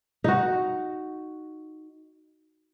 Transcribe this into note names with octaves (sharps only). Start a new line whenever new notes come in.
D#4 F#4